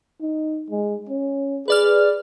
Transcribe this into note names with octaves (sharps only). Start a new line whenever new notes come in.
D#4
G#3
C#4
G#4 B4 D5 F6